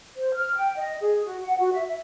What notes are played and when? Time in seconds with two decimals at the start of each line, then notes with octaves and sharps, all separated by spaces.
0.17 C5
0.34 F6
0.56 G5
0.77 D#5
1.01 G#4
1.25 F#4
1.43 F#5
1.59 F#4
1.73 E5
1.87 E5